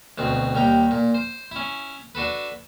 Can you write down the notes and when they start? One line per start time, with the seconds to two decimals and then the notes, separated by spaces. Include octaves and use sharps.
0.18 D2 B2 C4
0.55 D#2 G3 G5 A#5
0.91 A#2
1.14 C5
1.51 C#4 E4
2.15 D4 F#4 A4 B4